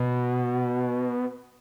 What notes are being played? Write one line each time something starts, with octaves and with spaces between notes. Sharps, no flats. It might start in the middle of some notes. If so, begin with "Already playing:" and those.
Already playing: B2